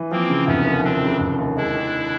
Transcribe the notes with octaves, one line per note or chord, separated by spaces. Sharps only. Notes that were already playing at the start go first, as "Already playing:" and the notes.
Already playing: E3
F3 A#3 C4
C#3
F1 B3 C#4
D#2
F3 C4 D4
C#3
F1
D#2
G#3 D4 E4
D#3